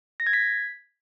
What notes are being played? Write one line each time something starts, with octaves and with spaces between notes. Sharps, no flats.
A#6
G#6
B6